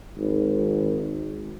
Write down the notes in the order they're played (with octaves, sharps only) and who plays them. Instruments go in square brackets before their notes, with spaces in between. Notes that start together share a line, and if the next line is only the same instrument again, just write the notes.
[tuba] G#1